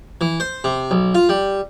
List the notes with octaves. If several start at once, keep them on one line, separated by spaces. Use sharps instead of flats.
E3
C5
C3
B1
F4
G3